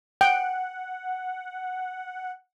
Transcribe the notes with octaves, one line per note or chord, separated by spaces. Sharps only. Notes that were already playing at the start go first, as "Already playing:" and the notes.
F#5 G5